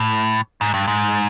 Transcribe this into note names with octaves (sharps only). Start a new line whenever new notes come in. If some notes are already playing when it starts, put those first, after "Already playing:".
Already playing: A2
G#2
G2
G#2